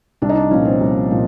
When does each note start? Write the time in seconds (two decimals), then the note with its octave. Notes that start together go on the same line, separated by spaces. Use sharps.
0.22 C2 D4
0.29 D#4
0.36 D4
0.51 A#2 F3 C#4
0.65 C4
0.80 C2
1.11 A#2 F3